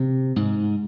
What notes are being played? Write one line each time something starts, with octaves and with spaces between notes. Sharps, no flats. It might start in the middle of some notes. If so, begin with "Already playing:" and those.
Already playing: C3
G#2